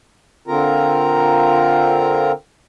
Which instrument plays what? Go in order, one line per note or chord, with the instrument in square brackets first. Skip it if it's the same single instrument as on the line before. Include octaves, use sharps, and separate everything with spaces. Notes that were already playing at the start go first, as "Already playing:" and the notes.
[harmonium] D3 C4 F4 A#4 A#5